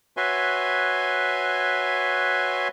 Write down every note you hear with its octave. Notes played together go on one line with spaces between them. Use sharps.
F#4 B4 C#5 E5 G#5 C6